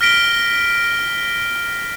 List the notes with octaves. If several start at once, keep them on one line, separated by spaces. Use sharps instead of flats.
F6 A#6 B6 D7 G7